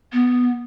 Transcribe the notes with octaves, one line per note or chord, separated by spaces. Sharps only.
B3